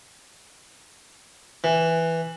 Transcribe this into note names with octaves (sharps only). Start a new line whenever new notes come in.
E3